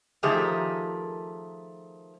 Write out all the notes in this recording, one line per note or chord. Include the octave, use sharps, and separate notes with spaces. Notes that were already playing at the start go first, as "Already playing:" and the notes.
D#3 F3 A3 G4 G#4 A#4